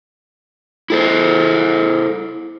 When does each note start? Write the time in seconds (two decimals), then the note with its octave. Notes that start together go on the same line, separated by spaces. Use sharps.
0.90 E4 A4 C5